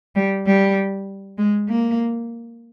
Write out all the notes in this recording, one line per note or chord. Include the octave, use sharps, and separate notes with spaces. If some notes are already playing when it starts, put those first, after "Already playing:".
G3
G3
G#3
A#3